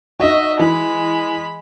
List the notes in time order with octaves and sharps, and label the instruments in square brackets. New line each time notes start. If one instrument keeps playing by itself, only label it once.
[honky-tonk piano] D#4 F#4 [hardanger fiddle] D#5 E5
[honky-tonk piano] E3 [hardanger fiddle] G#3 B5